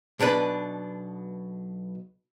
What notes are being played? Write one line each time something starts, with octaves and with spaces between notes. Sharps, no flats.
B1 B2 D4 B4 B5